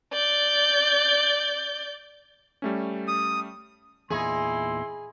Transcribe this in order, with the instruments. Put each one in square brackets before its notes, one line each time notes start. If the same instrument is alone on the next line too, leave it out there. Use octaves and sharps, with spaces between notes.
[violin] D5 G6
[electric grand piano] G3 A3 C#4
[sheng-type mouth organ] D#6
[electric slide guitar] E2 A#2 D#4 [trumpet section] E4 C6 [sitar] G#4